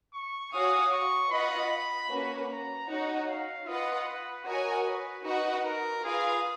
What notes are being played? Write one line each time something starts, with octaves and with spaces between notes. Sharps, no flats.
C#6
F#4 C#5 F5 G#5 D#6
C#6
F4 B4 D#5 F#5 B5
A#3 C#4 F#4 B4
A#5
D#4 F#4 C#5 F#5
F5
F4 B4 D#5 F#5
B4
F#4 A#4 C#5 D#5 G#5
B4
D#4 F#4 B4 D#5 F#5
A#4
F4 G#4 B4 F5